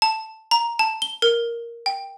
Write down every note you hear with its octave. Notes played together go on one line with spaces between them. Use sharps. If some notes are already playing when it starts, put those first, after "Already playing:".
A5
A#5
A5
G7
A#4
G5